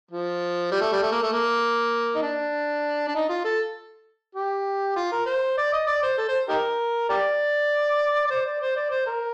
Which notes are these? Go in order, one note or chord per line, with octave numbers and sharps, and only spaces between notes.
F3
G3
A3
G3
A3
A#3
A3
A#3
D#4
D4
D4
D#4
F4
A4
G4
F4
A#4
C5
D5
D#5
D5
C5
A4
C5
D#4 G4 A#4
G4 A#4 D5
D5
C5
D5
C5
D5
C5
A#4